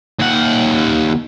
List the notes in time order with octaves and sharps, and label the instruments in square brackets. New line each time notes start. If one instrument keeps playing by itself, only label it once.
[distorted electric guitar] D#2 F#5